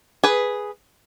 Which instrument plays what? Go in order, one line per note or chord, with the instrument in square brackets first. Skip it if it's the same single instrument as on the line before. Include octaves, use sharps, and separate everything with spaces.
[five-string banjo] G#4 B4